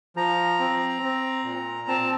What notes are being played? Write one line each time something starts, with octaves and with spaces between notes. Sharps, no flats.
F3 A#5
C4
C4
A#2
C4 A5